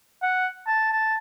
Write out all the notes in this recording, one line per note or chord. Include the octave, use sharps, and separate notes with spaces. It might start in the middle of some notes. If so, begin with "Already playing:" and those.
F#5
A5
A5